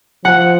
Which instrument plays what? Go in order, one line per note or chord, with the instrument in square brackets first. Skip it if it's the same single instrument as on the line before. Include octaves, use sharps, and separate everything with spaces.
[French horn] F3 [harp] F#5